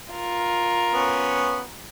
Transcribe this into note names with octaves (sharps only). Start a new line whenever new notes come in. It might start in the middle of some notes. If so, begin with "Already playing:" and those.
F4 A#4
B3 C#4